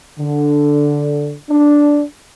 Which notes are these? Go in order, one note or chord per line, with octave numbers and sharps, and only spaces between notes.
D3
D4